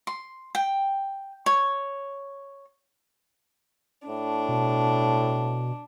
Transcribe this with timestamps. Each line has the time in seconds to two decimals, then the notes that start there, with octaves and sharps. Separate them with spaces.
0.07 C6
0.55 G5
1.46 C#5
4.08 A2 D4
4.49 B2